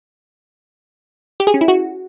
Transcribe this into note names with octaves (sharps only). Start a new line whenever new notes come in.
G4
G#4
C#4
E4
F#4